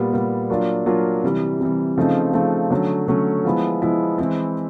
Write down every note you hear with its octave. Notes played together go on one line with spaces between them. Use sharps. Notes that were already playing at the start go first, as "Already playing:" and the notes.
Already playing: A#2 G3 B3
A#2 G3 B3
F#3 A#3 D4 F4
F#3 A#3 D4 F4
C3 E3 G3
C3 E3 G3
C#3 F3 A3 C4 D#4
C#3 F3 A3 C4 D#4
D3 F#3 A3 C#4
D3 F#3 A3 C#4
F3 G#3 B3 E4
F3 G#3 B3 E4
E3 G#3 C4 E4